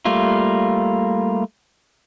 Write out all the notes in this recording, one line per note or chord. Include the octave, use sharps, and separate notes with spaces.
G3 A3 A#3 F4